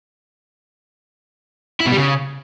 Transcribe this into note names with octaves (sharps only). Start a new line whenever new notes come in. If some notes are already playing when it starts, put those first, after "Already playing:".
E4
B2
G3
C#3